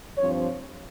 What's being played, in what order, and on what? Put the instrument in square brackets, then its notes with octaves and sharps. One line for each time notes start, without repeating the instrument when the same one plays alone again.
[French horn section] G2 F3 C4 C#5